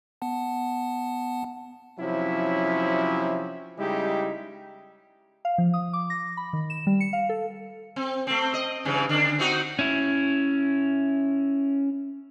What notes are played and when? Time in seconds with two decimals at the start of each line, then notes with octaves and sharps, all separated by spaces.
0.22 B3 F#5 A5
1.99 C3 F3 F#3 C#4 E4
3.79 C#3 G3 G#3 D#4 E4 G4
5.45 F5
5.58 F3
5.74 D#6
5.93 D6
6.10 A#6
6.37 B5
6.53 D#3
6.70 E7
6.87 G3
7.00 C#7
7.13 F5
7.29 A4
7.96 C4
8.27 A3 C4
8.54 D#5
8.85 G2 C#3 E3
9.09 D3 D4
9.39 C4 D#4 F#4
9.79 C#4 E4